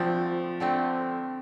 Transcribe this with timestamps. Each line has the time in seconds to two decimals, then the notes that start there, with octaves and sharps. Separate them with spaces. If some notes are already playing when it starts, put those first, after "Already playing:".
Already playing: D3 F3 A3 C4
0.60 D3 A3 C4